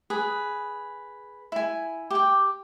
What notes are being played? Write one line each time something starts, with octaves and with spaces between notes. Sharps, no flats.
G#4 B4
E4 G#5
G4 G5